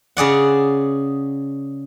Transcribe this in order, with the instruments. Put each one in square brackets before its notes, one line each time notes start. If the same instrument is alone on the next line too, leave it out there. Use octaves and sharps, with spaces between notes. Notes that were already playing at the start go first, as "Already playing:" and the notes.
[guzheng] C#3 G#4 D5 F#5